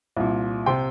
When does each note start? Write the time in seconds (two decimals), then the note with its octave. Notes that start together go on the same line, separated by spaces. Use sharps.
0.17 C2 A#2
0.66 C3 G5 C6